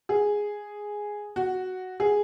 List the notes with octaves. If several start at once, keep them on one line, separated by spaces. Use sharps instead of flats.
G#4
F#4
G#4